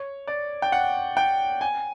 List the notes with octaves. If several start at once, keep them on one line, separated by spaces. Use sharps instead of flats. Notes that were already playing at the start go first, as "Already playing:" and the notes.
Already playing: C#5
D5
G5
F#5
G5
G#5